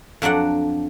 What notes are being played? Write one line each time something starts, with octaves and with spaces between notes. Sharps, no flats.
F2 F#3 D4 D5 F#5